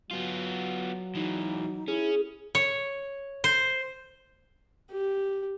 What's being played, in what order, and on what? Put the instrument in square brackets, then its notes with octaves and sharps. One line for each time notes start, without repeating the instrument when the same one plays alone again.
[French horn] F#3 [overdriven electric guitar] B3 F4
[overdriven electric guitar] E3 G#3 [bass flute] D#4
[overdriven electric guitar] C#4 [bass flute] E4 [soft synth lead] G#4
[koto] C#5
C5
[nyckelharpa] G4